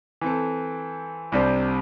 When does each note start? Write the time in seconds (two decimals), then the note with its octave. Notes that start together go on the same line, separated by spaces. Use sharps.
0.21 E3 C4 A4
1.32 C2 C3 G3 D4 C5